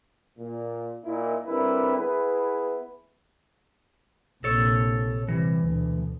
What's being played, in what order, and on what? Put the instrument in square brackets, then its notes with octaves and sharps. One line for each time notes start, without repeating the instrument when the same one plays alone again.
[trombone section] A#2
A#2 D#4 E4
D3 G3 C4 E4 A#4 B4
B3 E4 G#4 B4
[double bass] A#1 C3 [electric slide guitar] A4 C#5
[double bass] C3 G3 [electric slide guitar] E3
[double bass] D2 B2